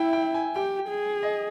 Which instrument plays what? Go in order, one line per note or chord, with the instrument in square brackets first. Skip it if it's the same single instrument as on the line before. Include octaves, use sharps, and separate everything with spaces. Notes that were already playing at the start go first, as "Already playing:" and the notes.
Already playing: [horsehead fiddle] E4 [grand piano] E5 G5
[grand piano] G5
G#5
[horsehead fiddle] G4 [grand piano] G5
[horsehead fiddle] G#4
[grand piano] D#5